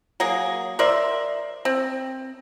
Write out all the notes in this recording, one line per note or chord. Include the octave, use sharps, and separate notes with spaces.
F#3 A#3 G#4
A#4 C5 D5 E5
C4